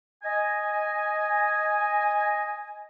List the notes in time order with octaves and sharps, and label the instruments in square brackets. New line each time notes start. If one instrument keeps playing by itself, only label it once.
[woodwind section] D#5 G#5